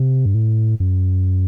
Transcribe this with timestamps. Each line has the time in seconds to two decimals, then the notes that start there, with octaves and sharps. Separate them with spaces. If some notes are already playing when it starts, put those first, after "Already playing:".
Already playing: C3
0.26 G2
0.34 A2
0.80 F#2